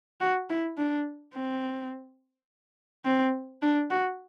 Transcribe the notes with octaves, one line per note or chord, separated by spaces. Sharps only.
F#4
E4
D4
C4
C4
D4
F#4